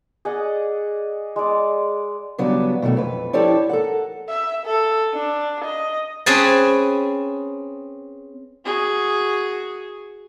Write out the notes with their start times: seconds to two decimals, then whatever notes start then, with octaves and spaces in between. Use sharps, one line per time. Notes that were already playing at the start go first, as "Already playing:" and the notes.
0.25 G#4 D5 D#5 F#5
1.36 G#3 D5
2.38 C#3 F#3 G3 B3 D4
2.82 B2 D#3 F#3 A3
2.97 F2 B4
3.33 F3 E4 G4 A4 C#5 D5
3.69 A4 A#4 F#5
4.29 E5
4.66 A4
5.14 D4
5.65 D#5
6.26 C4 C#4 G#4 B4 G#5 A5
8.65 F#4 G#4